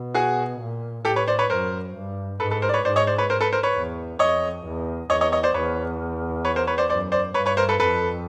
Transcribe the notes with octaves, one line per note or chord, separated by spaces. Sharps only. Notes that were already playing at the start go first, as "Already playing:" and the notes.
Already playing: B2
F#4 G#4
A#2
A2 G4 A4
B4 C#5
C5 D5
B4 C#5
F#2 A#4 C5
G2
G#2 A4 B4
A4 B4
A#4 C5
D5
B4 C#5
G#2 C5 D5
C#5 D#5
C5 D5
B4 C#5
A#4 C5
A4 B4
A#4 C5
B4 C#5
E2
F2 C#5 D#5
E2
E2 C#5 D#5
C#5 D#5
C#5 D#5
C5 D5
E2 B4 C#5
B4 C#5
A#4 C5
B4 C#5
C5 D5
F#2 C5 D5
C5 D5
G2 B4 C#5
B4 C#5
A#4 C5
A4 B4
F2 A4 B4